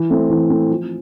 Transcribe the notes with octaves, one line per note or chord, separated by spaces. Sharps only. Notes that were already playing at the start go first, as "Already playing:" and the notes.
Already playing: E3
A3 C4
E3
A3 C4
F3